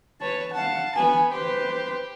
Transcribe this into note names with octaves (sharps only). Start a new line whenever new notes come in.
B4 C#5 A5
F5 F#5 A5
B3 G#5
G4 B4 C5